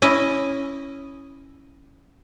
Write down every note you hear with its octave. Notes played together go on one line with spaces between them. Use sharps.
C#4 E4 D#5